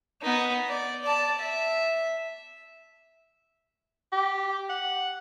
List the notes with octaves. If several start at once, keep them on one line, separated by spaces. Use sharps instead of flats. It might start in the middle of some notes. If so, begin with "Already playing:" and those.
B3 D#4
D5
D5 A5
E5
G4
F#5